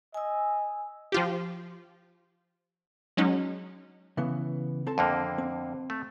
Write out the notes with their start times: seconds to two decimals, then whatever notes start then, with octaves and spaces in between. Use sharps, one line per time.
0.14 D#5 G#5 E6
1.12 F3 F4 G4
3.17 F#3 G#3 C#4 D#4
4.17 C#3 E3 B3
4.87 C4 A4 A5
4.98 F2 D3 A#3
5.38 C4
5.90 A3